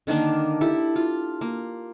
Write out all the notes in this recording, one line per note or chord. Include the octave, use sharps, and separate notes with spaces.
D3 D#3 A#3 D4
E4 G4 A4
F4
A#3